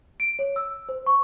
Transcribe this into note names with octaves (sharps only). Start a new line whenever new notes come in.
D7
C#5
E6
C5
C#6